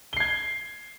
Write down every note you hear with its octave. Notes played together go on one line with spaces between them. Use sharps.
G#6 C7 G7